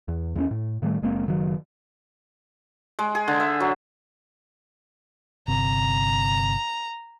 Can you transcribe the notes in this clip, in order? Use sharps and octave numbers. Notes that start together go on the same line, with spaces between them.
E2
E2 E3 B3 C#4
A2
A2 D#3 G3 A3
F#1 G#3 A#3 C4
F#1 D#3 F#3
G#3
G#4
D3
E5
F#3
G1 C3 A#5